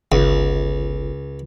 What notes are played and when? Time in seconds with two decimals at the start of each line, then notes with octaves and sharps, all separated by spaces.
0.12 G1 C#2